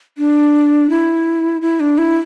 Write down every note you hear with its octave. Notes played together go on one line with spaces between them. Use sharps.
D4
E4
E4
D4
E4